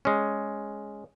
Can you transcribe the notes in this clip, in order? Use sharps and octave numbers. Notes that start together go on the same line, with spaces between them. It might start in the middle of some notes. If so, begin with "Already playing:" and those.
G#3 C#4